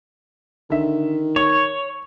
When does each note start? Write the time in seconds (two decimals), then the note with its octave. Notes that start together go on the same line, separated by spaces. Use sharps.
0.70 D3 D#3 E5
1.36 C#5 C#6